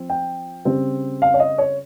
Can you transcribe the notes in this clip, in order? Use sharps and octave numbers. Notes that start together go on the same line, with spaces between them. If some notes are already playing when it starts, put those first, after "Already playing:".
Already playing: F3 C4
G5
C#3 G3 C4
F5
C#5
D#5
C#5